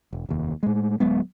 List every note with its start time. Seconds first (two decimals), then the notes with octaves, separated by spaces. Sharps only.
0.13 E1
0.29 F1 D#2
0.63 A2 G#3
1.00 D1 F#3 G#3 B3